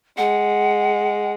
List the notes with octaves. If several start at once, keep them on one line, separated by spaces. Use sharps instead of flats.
G#3 F#5